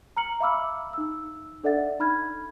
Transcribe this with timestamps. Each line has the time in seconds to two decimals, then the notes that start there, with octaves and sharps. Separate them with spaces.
0.17 A#5 F6 C#7 F#7
0.40 E5 F5 B5 D6 E6 F6
0.93 D#4 E6
1.64 D4 A4 D5 E5 F#5 A6
2.00 D#4 B5 F6 G#6